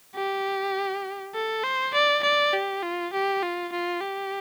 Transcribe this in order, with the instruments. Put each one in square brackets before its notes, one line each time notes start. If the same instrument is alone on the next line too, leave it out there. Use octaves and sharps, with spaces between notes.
[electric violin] G4
A4
C5
D5
D5
G4
F4
G4
F4
F4
G4